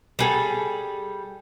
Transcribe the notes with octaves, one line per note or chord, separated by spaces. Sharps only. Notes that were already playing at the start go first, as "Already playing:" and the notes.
G3 G#4 A4